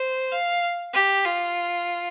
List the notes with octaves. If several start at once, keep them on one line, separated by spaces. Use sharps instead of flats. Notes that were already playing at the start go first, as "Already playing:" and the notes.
Already playing: C5
F5
G4
F4